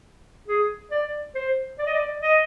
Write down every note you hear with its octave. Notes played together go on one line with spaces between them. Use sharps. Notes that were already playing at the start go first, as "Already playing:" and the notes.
G#4
D5
C5
D5
D#5
D5
D#5